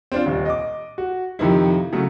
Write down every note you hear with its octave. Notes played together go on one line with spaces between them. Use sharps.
C4 D4 F4
D#1
D#5 D6
F#4
F2 C3 D#3 F3 E4
C#3 F#3 A3